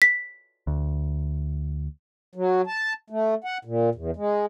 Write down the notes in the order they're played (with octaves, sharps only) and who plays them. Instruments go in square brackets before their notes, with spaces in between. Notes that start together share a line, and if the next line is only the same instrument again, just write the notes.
[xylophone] B6
[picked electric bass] D2
[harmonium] F#3
A5
A3
F#5
A#2
E2
G#3